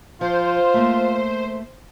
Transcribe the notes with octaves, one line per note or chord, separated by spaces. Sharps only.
F3 F4 C5
A3 A#3